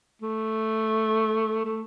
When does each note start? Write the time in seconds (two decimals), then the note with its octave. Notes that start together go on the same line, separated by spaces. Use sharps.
0.22 A3
1.65 A3